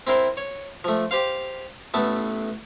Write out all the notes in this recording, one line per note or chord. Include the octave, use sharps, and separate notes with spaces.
C4 E4 A#4 C5
C#5
F3 A3
G4 C5 F5
A1 A3 B3 A5